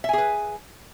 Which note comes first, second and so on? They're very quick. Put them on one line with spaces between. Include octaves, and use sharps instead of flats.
E5 G#5 G#4 B4